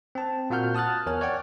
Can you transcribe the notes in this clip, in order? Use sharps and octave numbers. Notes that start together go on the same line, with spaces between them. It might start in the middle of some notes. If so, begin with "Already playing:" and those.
C4 A5
A#2 A#3 F#4 F#5 F6 G6
A5 D#6 F6 F#6 A6
E2 A#4 C#5 G#5 F6
C#5 D5 F#5 G5